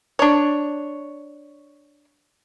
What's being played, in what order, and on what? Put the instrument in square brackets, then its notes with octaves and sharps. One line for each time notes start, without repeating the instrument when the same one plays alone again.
[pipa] D4 C#5